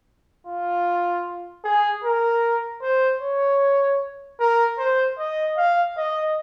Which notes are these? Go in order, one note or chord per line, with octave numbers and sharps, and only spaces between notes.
F4
G#4
A#4
C5
C#5
A#4
C5
D#5
F5
D#5